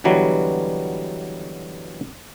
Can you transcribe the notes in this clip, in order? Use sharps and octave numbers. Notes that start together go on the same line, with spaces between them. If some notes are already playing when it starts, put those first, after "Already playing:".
B2 D3 E3 F#3 G3